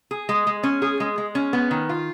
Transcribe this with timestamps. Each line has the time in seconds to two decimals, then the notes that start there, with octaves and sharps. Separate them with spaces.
0.11 G#4
0.29 G#3
0.47 G#3
0.63 C#4
0.82 G#4
1.00 G#3
1.18 G#3
1.35 C#4
1.53 B3
1.71 D#3
1.89 F4